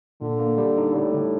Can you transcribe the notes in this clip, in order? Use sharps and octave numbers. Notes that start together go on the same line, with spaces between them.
A#2 D3
A#3
G3
D#4
A2 G3
D3